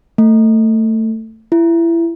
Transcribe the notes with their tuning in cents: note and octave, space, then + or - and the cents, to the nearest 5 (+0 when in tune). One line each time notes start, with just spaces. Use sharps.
A3 +20
E4 +25